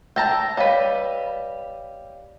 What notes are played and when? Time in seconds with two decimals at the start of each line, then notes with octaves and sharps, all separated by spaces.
0.16 G5 A5 A#5 E6 A#6
0.57 G3 B4 C#5 D#5 F5